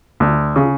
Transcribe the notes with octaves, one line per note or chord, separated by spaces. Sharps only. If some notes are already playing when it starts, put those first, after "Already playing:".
D2
C#3